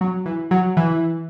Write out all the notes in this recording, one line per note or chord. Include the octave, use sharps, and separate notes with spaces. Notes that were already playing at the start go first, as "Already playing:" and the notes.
F#3
E3
F#3
E3